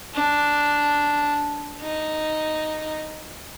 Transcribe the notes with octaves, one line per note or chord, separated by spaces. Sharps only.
D4
D#4